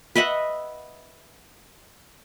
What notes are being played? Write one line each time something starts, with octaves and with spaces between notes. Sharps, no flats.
B4 D#5 E5 F#5